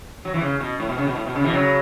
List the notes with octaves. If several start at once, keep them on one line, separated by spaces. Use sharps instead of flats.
F#3
E3
C#3
B2
A2
B2
C#3
B2
A2
B2
C#3
B2 E3
C#3 F#3